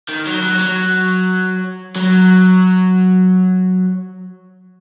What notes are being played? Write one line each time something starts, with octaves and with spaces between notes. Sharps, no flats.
D#3
F#3
F#3
F#3
F#3